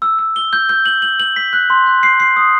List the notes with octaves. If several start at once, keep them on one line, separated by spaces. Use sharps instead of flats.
E6
E6
G7
G6
G6
F#7
F#7
F#7
B6
F#6
C6
F#6
C7
C7
D#6